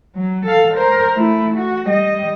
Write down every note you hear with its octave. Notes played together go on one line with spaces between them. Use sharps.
F#3
A4 F5
A#4 C5
A3 E4
F#4
G3 D#5